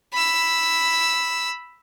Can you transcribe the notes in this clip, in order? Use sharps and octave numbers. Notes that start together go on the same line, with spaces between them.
B5 E6